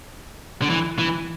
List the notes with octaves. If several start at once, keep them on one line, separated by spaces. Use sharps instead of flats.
D3
E3
E3